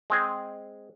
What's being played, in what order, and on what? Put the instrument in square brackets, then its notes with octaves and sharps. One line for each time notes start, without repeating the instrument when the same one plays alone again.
[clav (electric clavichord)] G#3 C4 G#4